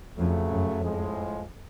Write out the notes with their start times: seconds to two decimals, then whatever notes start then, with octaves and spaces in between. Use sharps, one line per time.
0.18 F2 C#3 F#3 A3
0.50 F#2
0.81 F2 A2 F3 G#3